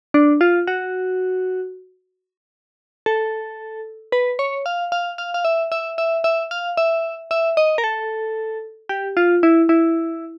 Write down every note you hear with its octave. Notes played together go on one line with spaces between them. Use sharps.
D4
F4
F#4
A4
B4
C#5
F5
F5
F5
F5
E5
E5
E5
E5
F5
E5
E5
D#5
A#4
A4
G4
F4
E4
E4